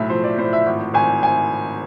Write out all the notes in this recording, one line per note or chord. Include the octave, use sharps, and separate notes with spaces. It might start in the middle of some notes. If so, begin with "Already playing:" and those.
Already playing: B1 A2 E5
F3 C5
D5
A2 C5
E5
G#1
G#1 G#5
G#5